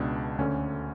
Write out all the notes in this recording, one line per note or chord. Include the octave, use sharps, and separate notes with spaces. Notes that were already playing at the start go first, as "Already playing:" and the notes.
Already playing: C#2 B2 D4
D2 D3 C#4